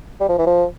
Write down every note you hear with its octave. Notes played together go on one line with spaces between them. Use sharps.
G3
F3
E3
F3